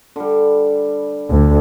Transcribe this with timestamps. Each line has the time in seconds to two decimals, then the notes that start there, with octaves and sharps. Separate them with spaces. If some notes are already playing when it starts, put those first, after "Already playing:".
0.16 D3 G3
1.30 D2